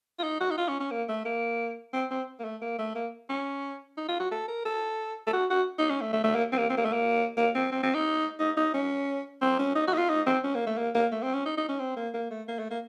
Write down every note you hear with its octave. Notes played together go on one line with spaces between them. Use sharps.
F4
D#4
F#4
D#4
F4
C#4
C#4
A#3
A3
A#3
C4
C4
A#3
A3
A#3
A3
A#3
C#4
D#4
F4
F#4
A4
A#4
A4
A4
F#4
F#4
D#4
C#4
A3
A3
A3
A#3
C4
A#3
C4
A#3
A3
A#3
A#3
C4
C4
C4
D#4
D#4
D#4
C#4
C4
C#4
D#4
F#4
D#4
F4
D#4
C4
C#4
A#3
A3
A#3
A#3
A3
C4
C#4
D#4
D#4
C#4
C4
A#3
A#3
A3
A#3
A3
A#3